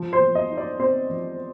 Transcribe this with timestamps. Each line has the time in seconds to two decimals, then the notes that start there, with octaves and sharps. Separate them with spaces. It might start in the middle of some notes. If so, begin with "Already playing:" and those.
Already playing: F3
0.13 C5
0.20 F3
0.35 D#5
0.50 D#4
0.57 D5
0.79 C4 C5
1.10 F3